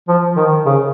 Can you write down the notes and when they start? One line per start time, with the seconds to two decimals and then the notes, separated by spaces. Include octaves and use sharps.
0.08 F3
0.36 D#3
0.65 C#3